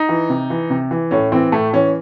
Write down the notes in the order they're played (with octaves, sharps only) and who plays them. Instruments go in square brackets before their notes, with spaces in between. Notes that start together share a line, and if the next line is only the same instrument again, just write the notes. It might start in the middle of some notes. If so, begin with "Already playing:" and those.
Already playing: [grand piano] D#4
E3
C3
E3
C3
E3
A2 C#4
E3 C4
A2 A3
E3 C#4